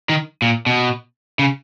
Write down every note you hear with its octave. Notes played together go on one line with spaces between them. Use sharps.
D#3
A#2
B2
C#3